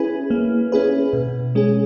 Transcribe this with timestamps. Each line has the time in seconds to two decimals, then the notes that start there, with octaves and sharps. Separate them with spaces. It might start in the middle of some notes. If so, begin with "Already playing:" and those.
Already playing: C#4 E4 G#4 B4
0.30 A#3
0.72 C#4 E4 G#4 B4
1.13 B2
1.55 G#3 C#4 G#4